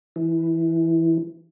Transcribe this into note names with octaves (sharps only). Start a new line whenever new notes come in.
E3